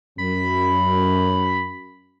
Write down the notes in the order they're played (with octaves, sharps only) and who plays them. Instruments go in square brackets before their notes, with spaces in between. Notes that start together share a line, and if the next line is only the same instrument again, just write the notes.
[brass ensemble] F#2 [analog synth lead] B5